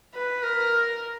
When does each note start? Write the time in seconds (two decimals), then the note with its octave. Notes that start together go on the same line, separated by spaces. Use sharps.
0.14 B4
0.43 A#4